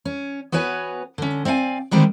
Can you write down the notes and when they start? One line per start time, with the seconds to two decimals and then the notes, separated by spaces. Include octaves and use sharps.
0.05 C#4
0.52 B3 F#4 B4 C#5 G#5
1.18 D3 C#4
1.45 C4 D5 F5 F#5 G#5
1.91 D3 D#3 G3 G#3 C4